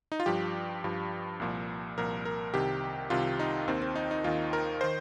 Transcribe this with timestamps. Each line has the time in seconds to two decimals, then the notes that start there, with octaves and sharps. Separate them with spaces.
0.12 D#4
0.20 F4
0.26 G2 F3 G4
0.84 G2 F3
1.40 C2 A#2 F3
1.98 C2 A#2 F3 A#4
2.25 A#4
2.54 C2 C3 D#3 G4
3.10 C2 C3 D#3 F4
3.39 D#4
3.68 D#2 D#3 C4
3.82 C4
3.95 D#4
4.11 D#4
4.24 D#2 D#3 F4
4.53 A#4
4.81 D#3 C5